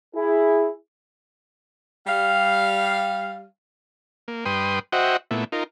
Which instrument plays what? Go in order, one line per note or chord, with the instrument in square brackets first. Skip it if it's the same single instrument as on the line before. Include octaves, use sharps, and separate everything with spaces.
[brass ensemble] E4 G#4
[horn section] G3 F5
[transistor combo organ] A#3
G2 B4 G5 C6 D#6
F#4 C5 D#5 E5 F#5 G5
A#2 A3 B3 E4
D#4 F4 A#4